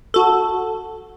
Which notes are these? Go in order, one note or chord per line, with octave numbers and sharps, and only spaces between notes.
F#4 A4